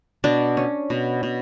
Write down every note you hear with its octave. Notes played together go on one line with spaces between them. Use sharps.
B2 D4
C#4
B2
B2